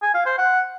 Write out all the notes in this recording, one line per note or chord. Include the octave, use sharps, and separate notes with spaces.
G#5
F5
C5
F#5